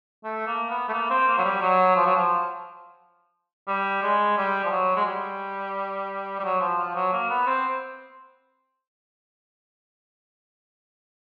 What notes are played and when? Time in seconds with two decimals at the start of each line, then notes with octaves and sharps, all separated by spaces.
0.24 A3
0.47 A#3
0.70 B3
0.89 A3
0.93 A#3
1.10 C4
1.28 A#3
1.38 F#3
1.45 G3
1.62 F#3
1.96 F3
2.06 F#3
2.16 F3
3.68 G3
4.03 G#3
4.37 G3
4.65 F3
4.71 F#3
4.96 G#3
5.05 G3
6.39 G3
6.44 F#3
6.60 F3
6.78 F3
6.95 F#3
7.12 A#3
7.30 B3
7.47 C4